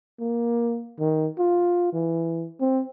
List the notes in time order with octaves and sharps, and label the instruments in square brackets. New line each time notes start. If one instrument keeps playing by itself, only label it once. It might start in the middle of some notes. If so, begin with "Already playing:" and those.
[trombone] A#3
D#3
F4
E3
C4